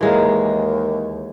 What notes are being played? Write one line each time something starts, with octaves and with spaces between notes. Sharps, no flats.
D#2 E3 G#3 A#3